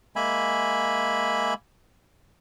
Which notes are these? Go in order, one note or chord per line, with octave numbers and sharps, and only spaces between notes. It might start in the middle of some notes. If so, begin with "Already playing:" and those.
G#3 A#3 E5 G#5 B5